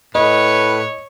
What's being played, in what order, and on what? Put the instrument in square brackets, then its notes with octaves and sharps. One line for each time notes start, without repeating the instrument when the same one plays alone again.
[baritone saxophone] A2 [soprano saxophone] B4 [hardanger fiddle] C#5 [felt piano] D#5